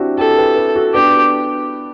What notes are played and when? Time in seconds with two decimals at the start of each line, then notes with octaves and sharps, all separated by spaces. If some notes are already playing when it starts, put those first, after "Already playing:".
Already playing: C4 D4 E4 F#4 G4
0.18 E4 G4 A4
0.37 G4 B4
0.56 G4 B4
0.75 F#4 A4
0.94 B3 D4 G4